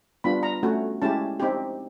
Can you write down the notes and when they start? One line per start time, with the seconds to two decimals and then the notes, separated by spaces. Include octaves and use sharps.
0.24 G3 B3 D4 F4 B5
0.43 A#5
0.63 A3 C#4 F#4
1.02 G#3 C#4 E4 G4 A5
1.40 C4 D#4 G4